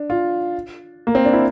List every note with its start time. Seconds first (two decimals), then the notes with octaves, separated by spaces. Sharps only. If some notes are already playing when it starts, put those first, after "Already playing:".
Already playing: D4
0.10 F4
1.07 A#3
1.15 C4
1.25 D4
1.33 E4